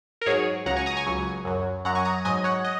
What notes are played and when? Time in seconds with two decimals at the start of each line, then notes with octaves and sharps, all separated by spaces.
0.22 A#4
0.26 G#2 F#3 G#4 C#5
0.66 C#2 C#3 F#3 F#5 A#5
0.76 G#5 C#6
0.86 A#5 D#6
0.97 G#5 C#6
1.07 C#2 C#3 F#3
1.45 F#2 F#3
1.85 F#2 F#3 F#5 A#5
1.95 G#5 C#6
2.05 A#5 D#6
2.25 G#2 F#3 D#5 G#5
2.44 C#5 F#5
2.65 D#5